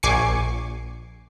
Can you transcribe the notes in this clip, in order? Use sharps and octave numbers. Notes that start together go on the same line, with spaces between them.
A#1 G#5 C#6 D6 C7 C#7